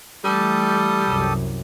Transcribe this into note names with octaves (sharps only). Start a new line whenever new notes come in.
E3 G3 A3 G4 A4 D#6
C2 F#2